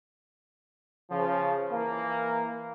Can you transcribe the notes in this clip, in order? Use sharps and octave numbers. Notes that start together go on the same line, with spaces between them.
C#3 F3
E3 A#3